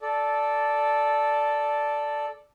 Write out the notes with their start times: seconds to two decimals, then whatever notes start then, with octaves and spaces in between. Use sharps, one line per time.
0.01 A4 D5